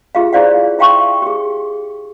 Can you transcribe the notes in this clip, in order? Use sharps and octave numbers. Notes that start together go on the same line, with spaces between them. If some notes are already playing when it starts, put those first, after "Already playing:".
F4 G4 G#4 E5 F5
E4 G#4 C5 D5 F5 F#5
E4 E5 F5 G5 C6 C#6
G4 G#4